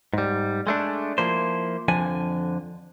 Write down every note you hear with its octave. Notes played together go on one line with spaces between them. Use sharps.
G#2 G3
G#3 A3 D4
F3 A#3 E4 C5
F2 D3 F3 G#5